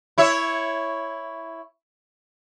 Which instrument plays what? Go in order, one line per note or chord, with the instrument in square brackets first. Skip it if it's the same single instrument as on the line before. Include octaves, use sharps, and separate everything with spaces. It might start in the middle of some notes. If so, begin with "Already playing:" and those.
[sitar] E4 C#5 E5